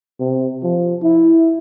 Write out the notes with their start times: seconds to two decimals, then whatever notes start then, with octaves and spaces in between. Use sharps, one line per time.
0.20 C3
0.63 F3
1.03 E4